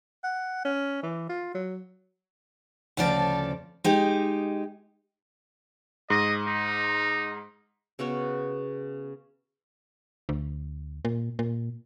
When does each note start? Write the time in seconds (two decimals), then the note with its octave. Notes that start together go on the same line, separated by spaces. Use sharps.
0.24 F#5
0.65 C#4
1.03 E3
1.29 F4
1.55 F#3
2.97 D2 C#3 F3 A4 D5
3.84 G#3 D#4 G4
6.10 G#2 D#5
6.48 D#4
7.99 C#3 B3 F#4 C#5
10.29 D2
11.05 A#2
11.39 A#2